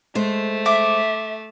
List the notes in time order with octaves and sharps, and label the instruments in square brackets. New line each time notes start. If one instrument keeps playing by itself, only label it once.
[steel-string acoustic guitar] G#3 C5 [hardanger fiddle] A3
[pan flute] E5 [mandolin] D6